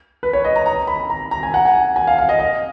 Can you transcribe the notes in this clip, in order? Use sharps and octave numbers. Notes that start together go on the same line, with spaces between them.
B4
C#5
D#5
A#5
A#5
B5
A#5
A#5
G#5
F#5
G#5
G#5
F5
F5
D#5
D#5